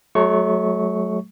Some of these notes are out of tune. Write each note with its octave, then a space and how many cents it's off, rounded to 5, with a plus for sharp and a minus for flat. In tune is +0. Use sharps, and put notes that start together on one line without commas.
F#3 +0 A3 -35 C#6 +0